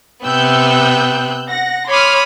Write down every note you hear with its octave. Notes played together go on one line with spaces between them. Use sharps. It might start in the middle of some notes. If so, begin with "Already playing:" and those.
C3 B3 G5 E6 F#6 G6
F#5 A#6
C#5 B5 C6 D6 D#6 F6